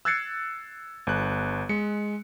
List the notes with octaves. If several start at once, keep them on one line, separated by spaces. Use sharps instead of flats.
E6 F#6 G#6 A6 C7 C#7
G1 F#6
G#3 C#7